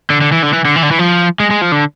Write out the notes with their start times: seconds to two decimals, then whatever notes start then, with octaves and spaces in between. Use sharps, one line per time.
0.10 D3
0.21 D3
0.32 E3
0.43 D3
0.53 E3
0.65 D3
0.76 E3
0.83 D3
0.91 E3
0.99 F3
1.40 G#3
1.51 G#3
1.61 F3
1.72 D3